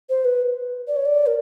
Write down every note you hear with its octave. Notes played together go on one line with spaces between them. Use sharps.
C5
B4
D5
C#5
D5
A#4